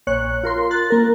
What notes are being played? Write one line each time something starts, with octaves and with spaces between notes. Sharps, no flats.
A#1 C#5 F#6
F4 A#4 C6
F#6 A6
A#3 A#4